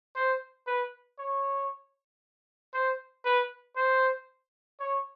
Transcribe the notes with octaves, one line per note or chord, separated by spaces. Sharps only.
C5
B4
C#5
C5
B4
C5
C#5